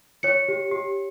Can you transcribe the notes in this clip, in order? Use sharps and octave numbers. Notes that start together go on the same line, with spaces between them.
C#5 C#7
G4
G4